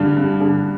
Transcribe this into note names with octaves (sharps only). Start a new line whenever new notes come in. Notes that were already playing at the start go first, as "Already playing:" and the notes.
Already playing: G2 D3
G2
D3